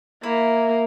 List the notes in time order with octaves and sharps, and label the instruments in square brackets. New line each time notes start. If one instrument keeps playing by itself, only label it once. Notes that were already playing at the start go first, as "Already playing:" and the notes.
[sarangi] A#3 [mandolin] E4